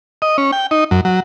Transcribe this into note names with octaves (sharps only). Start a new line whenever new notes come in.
D#5
C#4
G5
D#4
F#2
F#3